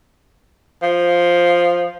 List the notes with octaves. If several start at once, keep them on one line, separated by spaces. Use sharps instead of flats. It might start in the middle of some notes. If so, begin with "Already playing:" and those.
F3